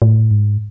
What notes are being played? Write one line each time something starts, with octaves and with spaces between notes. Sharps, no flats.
A2
G#2